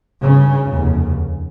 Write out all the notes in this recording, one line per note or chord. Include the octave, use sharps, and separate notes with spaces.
G#1 G2 C#3
F1 D#2 C#3